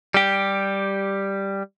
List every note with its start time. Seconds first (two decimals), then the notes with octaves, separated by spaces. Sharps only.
0.14 G3 G4